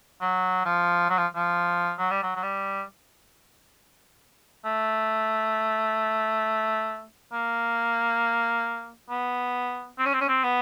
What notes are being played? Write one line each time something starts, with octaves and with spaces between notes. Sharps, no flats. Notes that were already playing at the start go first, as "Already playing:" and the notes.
F#3
F3
F#3
F3
F3
F#3
G3
F#3
F#3
G3
A3
A#3
B3
C4
C#4
C4
C#4
C4
B3